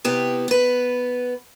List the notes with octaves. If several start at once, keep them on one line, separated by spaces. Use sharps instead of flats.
C3 B3 E4 G4
B3 B4